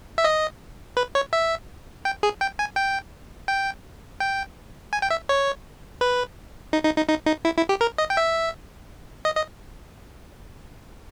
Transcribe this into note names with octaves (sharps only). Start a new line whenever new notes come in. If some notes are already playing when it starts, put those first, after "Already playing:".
E5
D#5
B4
C#5
E5
G5
G#4
G5
G#5
G5
G5
G5
G#5
G5
E5
C#5
B4
D#4
D#4
D#4
D#4
D#4
E4
E4
G4
A#4
D#5
G5
E5
D#5
D#5